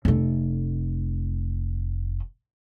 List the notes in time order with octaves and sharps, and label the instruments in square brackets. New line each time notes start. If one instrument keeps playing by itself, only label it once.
[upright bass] F1 A3